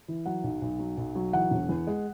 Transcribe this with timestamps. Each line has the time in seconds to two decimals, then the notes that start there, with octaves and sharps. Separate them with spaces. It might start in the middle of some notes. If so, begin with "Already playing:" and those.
0.08 E3
0.26 F#3 F#5
0.44 B1
0.62 B1
0.79 F#3
0.97 B1
1.15 F#3
1.33 E3 F#5
1.51 E1
1.69 E2
1.87 G#3